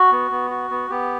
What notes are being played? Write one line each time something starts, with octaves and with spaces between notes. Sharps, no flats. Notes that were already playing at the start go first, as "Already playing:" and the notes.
Already playing: F#4
B3
B3
F#4
B3
B3 G4